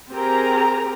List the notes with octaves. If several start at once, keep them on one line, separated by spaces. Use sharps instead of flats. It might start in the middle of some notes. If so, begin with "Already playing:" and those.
C4 G4 G#4 A#4 A#5